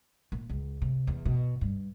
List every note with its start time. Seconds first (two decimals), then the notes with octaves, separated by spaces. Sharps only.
0.32 A#2
0.50 C#2
0.82 C3
1.07 E2
1.25 B2
1.61 G2